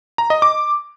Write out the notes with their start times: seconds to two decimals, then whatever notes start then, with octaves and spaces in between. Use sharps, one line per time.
0.18 A#5
0.30 D#5
0.42 D6